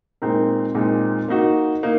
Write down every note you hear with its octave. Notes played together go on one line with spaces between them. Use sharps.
A#2 G#3 C4 D#4 A#4
A#2 G#3 C4 D#4 A#4
A#3 D#4 F#4
A#3 D#4